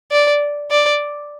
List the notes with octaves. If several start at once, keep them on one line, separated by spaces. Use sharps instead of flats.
D5
D5